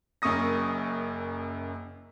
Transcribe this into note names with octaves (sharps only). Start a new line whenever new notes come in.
F#1 F#2 A#3 C#6 D#6 A#6